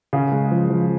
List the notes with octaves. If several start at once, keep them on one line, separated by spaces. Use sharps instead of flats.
C#3
G#3
F3
F3